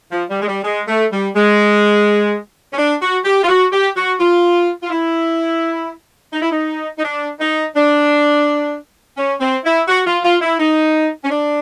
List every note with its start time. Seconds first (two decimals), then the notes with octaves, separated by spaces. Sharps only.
0.11 F3
0.29 G3
0.41 G#3
0.47 G3
0.64 G#3
0.87 A3
1.11 G3
1.35 G#3
2.73 C#4
2.77 D4
3.01 F#4
3.25 G4
3.42 F4
3.48 F#4
3.72 G4
3.96 F#4
4.19 F4
4.82 F4
4.90 E4
6.33 D#4
6.42 E4
6.51 D#4
6.97 D#4
7.03 D4
7.39 D#4
7.75 D4
9.17 C#4
9.40 C4
9.64 E4
9.88 F#4
10.06 F4
10.23 F4
10.41 E4
10.59 D#4
11.24 C#4
11.30 D4